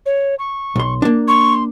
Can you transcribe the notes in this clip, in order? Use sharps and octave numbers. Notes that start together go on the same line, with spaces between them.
C#5
C#6
B1 C6
A#3 D4
C6 C#6